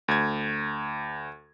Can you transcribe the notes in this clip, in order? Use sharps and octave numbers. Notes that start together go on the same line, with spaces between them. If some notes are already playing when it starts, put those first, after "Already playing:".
D2 G#6